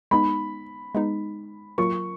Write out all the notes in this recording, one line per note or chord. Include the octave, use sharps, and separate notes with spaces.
G#3 B3 D#4 B5
G#3 B3 D#4
F#3 A#3 F4 A#4 C#6